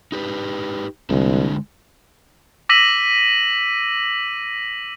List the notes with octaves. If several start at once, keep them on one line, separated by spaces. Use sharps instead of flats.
D#4 G4 B4
C2 D3 G#3 D4
D6 E6 A#6 B6 D#7 F#7